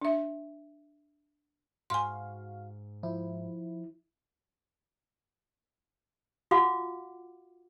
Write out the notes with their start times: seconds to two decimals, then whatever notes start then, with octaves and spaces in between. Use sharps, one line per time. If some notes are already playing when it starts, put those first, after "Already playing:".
0.01 D4 E5
1.90 G#2 F#4 F5 G#5 C6
3.03 F3 E4
6.51 F4 F#4 F5 F#5 D6